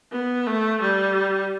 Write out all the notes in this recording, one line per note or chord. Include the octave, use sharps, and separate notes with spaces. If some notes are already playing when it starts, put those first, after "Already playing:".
B3
A3
G3